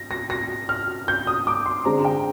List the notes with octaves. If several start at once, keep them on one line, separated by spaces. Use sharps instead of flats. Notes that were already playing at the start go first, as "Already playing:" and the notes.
Already playing: A#6
A#6
A#6
F6
G6
D#6
D6
C6
D3 G#3 C4 A#5
G5